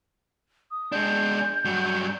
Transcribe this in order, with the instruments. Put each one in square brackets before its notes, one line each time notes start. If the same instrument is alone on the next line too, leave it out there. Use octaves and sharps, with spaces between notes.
[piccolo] D#6
[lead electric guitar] G#3 D4 [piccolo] G6
[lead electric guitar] G2 F#3